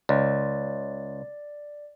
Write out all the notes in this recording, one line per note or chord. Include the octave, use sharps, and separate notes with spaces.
C#2 D5